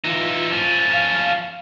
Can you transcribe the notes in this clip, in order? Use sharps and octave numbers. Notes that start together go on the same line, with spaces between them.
E3 D#4 F4
F3 C#4
F5